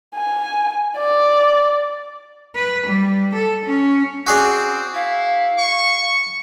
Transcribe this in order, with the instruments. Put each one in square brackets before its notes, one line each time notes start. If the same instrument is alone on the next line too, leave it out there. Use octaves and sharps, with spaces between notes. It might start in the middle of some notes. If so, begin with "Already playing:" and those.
[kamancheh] G#5
D5
[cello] B4
G3
A4
C#4
[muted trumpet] C4 [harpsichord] F#4 G#4 D5
[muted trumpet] E4 [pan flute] F5
[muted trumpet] C#6